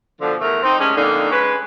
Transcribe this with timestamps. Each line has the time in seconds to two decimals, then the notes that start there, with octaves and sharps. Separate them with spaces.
0.20 B2 D3 F3
0.41 E2 A3 A#4
0.63 C4 D#4
0.78 A2 G3 G#3 C#4
0.96 F2 D3 A#3 D4 D#4
1.31 G#3 C#4 B4